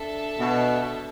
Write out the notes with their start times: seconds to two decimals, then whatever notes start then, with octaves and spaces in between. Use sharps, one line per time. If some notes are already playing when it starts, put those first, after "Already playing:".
Already playing: D4 A4 E5 A5
0.39 B2